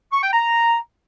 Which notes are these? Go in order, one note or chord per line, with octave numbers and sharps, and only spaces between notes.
C#6
G5
A#5